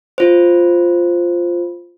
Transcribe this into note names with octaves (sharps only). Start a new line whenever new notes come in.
F4 C5